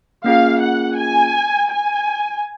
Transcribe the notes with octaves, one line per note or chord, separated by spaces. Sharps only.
A#3 C#4 F4 G#4 F5
F#5
G#5
G#5